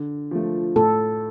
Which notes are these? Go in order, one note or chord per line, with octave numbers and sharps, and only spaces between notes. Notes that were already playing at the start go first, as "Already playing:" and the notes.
Already playing: D3
F3 A3
A2 A4